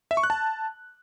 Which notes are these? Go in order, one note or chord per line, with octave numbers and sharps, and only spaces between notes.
E5
C#6
F#6
A5